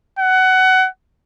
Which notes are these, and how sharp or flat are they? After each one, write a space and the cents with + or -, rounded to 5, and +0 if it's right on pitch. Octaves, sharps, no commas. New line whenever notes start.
F#5 +20